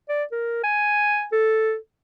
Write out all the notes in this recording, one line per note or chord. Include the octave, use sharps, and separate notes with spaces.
D5
A#4
G#5
A4